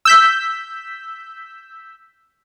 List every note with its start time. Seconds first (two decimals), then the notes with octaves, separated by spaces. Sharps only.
0.05 E6 G6 B6